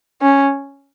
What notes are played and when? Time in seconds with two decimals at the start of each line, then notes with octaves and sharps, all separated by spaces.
0.22 C#4